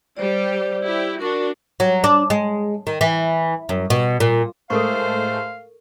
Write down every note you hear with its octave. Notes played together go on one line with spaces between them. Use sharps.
G3 G4 C5 D5
E4 G4
D4 F#4 A#4 C#6
F#3
D4
G#3
D#3
E3
F#2
B2
A#2
A2 G#3 A3 A4 A#4 C5 F5 C#6